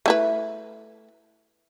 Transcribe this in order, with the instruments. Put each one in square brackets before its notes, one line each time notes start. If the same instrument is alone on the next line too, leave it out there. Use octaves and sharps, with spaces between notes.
[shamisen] A3 E4 B4